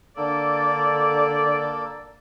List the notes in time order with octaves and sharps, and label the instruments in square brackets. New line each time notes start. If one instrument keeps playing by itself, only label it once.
[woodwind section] D3 D5 [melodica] A#3 A4